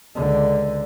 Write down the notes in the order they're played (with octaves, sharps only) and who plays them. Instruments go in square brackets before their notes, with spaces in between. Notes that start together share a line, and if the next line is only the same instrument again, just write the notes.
[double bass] C#2 D3